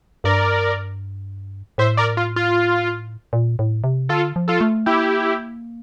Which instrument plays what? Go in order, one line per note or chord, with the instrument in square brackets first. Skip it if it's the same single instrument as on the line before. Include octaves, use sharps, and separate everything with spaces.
[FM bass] G2 [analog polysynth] A#4 D5
[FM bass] A2 [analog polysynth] C5 E5
[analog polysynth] A#4 D5
F4
F4
[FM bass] A#2
A2
C3
[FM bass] D3 [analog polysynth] F4 A4
[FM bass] F3
[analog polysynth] F4 A4
[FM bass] A3
[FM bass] A#3 [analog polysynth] E4 G4